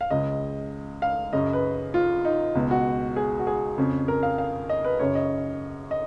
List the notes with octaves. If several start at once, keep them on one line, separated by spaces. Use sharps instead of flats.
F5
C#2 C#3 D#5
F5
F#2 C#3 D#5
B4
F4
D#4
C#2 B2
F#4
G#4
F#4
G#4
F2 C#3
A#4
F5
F5
D#5
B4
F#2 C#3 C#5
D#5
D#5